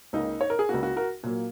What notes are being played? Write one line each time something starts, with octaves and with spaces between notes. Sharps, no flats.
C#2 C#3 A#3 D#4
C#5
A#4
G#4
C#2 C#3 A#3 F#4
F#4
F#4 A#4
A#2 F#3 A#3